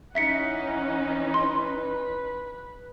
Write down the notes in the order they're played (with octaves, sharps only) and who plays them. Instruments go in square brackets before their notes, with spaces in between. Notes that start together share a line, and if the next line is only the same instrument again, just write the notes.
[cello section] E3 C#4 D#4 [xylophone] E5 B6 C#7 [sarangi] F#5
[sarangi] B4 [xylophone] C6